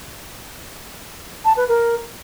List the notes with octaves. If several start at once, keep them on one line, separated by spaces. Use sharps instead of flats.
A5
B4
A#4